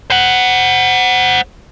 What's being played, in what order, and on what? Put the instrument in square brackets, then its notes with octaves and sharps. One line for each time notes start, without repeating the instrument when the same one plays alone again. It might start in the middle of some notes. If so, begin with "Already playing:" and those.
[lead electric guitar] C5 F#5